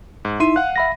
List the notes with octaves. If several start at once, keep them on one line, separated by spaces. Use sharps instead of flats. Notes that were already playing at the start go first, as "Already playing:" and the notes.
G#2
D#4 E4 E5 C6 D#7
F5 F#5 F#6
E5 B5 A#6